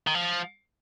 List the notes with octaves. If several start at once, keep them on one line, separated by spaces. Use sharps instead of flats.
D#3
F3